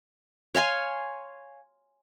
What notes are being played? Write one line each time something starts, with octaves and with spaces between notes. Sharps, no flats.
C#5 F5 G#5 C6